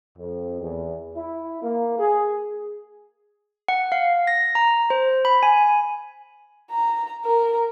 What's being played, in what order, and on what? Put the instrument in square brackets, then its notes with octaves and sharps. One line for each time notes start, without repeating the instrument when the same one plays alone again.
[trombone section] F2
E2
E4
A#3
G#4
[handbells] F#5
F5
A#6
A#5
C5
B5
G#5
[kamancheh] A#5
A#4